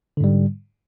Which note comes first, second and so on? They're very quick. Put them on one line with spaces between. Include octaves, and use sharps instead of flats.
D3 G#2 G3